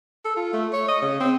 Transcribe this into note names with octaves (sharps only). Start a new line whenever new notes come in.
A4
F4
A3
C#5
D#5
C#3
C4